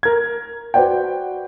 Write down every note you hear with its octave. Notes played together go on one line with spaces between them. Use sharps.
A#4 G#6
F#4 B4 C5 D5 F#5 G5